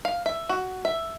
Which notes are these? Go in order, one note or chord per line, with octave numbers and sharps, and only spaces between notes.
F5
E5
F#4
E5